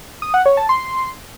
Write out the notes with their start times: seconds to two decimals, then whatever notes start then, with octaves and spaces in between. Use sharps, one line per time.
0.22 D#6
0.34 F#5
0.46 C#5
0.57 A5
0.69 C6